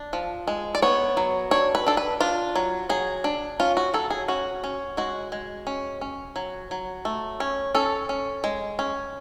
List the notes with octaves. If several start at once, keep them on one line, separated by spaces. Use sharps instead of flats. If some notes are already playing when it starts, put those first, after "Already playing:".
Already playing: D4
F3
G#3
D5
B3 C#5
F#3
D4 C#5
B4
D4 A4
B4
D4 F4
F#3
F#3 G#4
D4
C#4 F4
F#4
F#3 A4
G#4
C#4 F#4
C#4
G#3 F#4
G#3
C#4
C#4
F#3
F#3
A3
C#4
C#4 A4
C#4
G#3
C#4